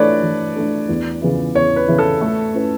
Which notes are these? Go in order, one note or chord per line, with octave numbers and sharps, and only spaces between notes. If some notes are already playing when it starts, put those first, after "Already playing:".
Already playing: E3 A3 D4 A4 B4 C#5 D5
E3
A3 D4 A4
E2
C#3 E3 B3 E4
E2 C#5
B4
C#3 E3 B3 E4
A4
A3
C#4 E4 B4